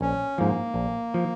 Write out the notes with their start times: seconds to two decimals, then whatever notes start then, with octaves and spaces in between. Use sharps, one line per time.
0.01 A#1 C#4
0.38 G#2 F3 A#3
0.74 A#1
1.14 F3